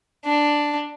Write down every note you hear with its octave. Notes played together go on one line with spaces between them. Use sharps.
D4